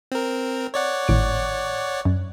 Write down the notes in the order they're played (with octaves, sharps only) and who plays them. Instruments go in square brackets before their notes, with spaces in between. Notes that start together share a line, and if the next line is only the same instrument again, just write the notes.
[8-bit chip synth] C4 A#4
C#5 D5 F#5
[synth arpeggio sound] G#1 A2 D7
F#2